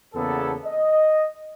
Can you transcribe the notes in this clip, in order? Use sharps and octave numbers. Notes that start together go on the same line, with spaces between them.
E2 C#3 A#3 B3 A4
D#5